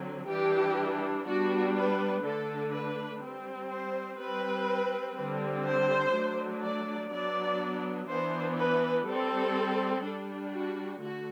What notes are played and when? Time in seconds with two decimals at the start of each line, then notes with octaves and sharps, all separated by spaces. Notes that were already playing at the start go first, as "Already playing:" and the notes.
Already playing: D3 F#3 C4
0.28 E3 G3 D4 G4
1.26 G3 B3 D4 F#4
1.75 B4
2.23 D3 A3 D4 A4
2.72 B4
3.22 G3 C4
3.70 C5
4.18 G3 C4 B4
5.16 D3 G3 C4
5.65 C5
6.13 F#3 A3 D4
6.62 D5
7.10 F#3 B3 D4 D5
8.08 E3 B3 D4 C5
8.56 B4
9.05 G3 C4 A4
10.03 G3 D4
10.52 F#4
11.01 D3 A3 F#4